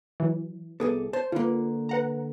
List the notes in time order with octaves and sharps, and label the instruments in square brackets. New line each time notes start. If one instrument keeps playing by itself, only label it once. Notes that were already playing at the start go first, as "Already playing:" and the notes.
[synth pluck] E3 F#3
[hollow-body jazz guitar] C2 G#4 A4 [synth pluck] B3 D6
[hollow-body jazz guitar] C5 [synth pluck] A5
[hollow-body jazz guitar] D3 A#3 [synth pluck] F4 B4
[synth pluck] B4 F#5 A#5